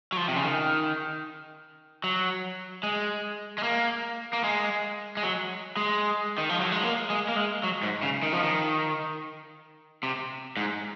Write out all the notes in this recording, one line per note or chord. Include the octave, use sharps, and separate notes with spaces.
F#3
F3
C3
C#3
D#3
F#3
G#3
G#3
A#3
A#3
G#3
G#3
F#3
G#3
D#3
F3
F#3
G#3
A#3
G#3
A#3
G#3
F#3
G#2
C#3
D#3
F3
D#3
C3
G#2